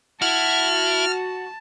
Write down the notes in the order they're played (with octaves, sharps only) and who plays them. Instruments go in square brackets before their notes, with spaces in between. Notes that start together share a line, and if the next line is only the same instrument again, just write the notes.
[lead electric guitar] E4 [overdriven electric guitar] F#4 [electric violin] A5 [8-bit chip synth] F6